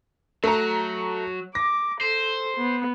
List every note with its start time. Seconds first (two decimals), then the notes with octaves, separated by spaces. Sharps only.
0.44 F#3 A3 A#5
1.55 D6 A#6
2.01 A4 C5
2.57 B3